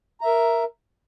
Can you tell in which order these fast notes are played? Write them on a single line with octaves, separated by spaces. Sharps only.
A#5 E5 A#4